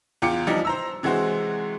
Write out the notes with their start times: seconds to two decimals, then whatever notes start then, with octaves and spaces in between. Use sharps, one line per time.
0.22 E2 F4 G5 D6 C#7
0.47 E3 F3 G3 D4 D#4
0.65 C5 A#5 E6
1.03 C3 E3 G#3 F#4 C5